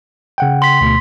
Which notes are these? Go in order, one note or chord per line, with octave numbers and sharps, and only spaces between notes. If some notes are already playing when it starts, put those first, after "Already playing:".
C#3 F#5 G5
C6 B6
D2 B2 A3